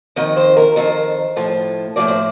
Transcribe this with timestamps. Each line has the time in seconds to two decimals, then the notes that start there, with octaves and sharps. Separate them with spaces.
0.16 F2 D#3 D#5
0.36 C5
0.56 A#4
0.76 F2 D#3 C5
1.36 A2 F3
1.96 A2 F3 D5
2.08 C5